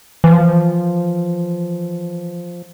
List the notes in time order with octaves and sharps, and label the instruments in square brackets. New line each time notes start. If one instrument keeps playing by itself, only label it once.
[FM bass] E3 [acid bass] F3